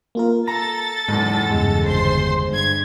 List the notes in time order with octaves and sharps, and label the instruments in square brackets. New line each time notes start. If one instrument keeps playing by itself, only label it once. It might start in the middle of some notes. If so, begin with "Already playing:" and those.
[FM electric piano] A#3 F4 A#4
[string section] A4 A6 [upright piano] A#5 [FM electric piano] A#6
[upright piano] F#1 E2 [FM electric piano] G#2
[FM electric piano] E2 G2 C#3 [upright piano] G#3
[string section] G1 C5 C6
G2 G#6